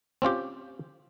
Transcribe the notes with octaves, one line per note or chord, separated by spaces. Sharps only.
C4 C#4 F4 G4